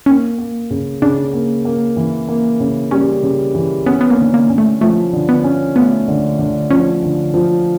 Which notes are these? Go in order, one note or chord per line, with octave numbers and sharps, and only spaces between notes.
A#3 C#4
A#3
C#3
C#3 D4
A#3
A#3
E3
A#3
C#3
G3 C#4
C#3
E3
B3 C#4
B3
A#3
D3
A#3
C#4
A3
F3 A3
D3
B3
C#4
A3 B3
D3
D3
F3 C#4
D3
F3